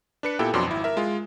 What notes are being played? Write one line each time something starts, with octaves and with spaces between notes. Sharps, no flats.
D4 B4 C#7
A#2 B3 E4 G4 A4 G5
F2 B2 F#3 D4 C6 D6
G#1 E4
A#4 E5
G#3 F4